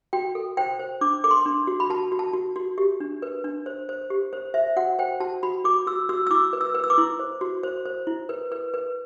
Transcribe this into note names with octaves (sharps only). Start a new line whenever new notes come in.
F#4 G5
A4
C5 G5
C5
D4 D6
A4 D6
C6
D4
F#4
B5
F#4 A5
F#4
A5
F#4
F#4
G4
D4
B4
D4
C5
C5
G4
C5
C5 E5
F#4 F#5
C5 G5
F#4 A5
F#4 B5
F#4 D6
F#4 E6
F#4 E6
E6
E4 D6
B4
E6
B4
E6
D6
E4
C5
F#4
C5
C5
E4
B4
B4
B4